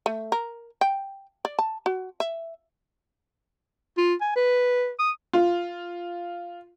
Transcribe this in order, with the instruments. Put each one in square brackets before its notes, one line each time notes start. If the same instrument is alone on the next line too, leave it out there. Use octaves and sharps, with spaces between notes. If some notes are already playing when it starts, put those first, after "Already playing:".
[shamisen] A3
A#4
G5
D5
A5
F#4
E5
[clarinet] F4
G#5
B4
D#6
[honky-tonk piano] F4